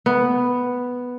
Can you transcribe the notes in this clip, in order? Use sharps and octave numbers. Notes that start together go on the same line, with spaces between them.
B3